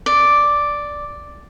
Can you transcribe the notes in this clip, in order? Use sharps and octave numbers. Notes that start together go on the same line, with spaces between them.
D5